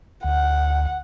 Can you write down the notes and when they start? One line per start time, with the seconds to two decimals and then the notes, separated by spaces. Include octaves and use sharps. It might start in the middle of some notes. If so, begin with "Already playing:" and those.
0.24 D2 F#5